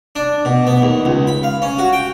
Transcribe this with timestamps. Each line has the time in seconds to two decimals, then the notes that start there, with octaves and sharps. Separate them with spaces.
0.16 D4
0.45 B2
0.67 B3
0.82 D#2
1.05 C#2
1.27 B5
1.43 F5
1.62 C#4
1.78 F#4
1.93 G5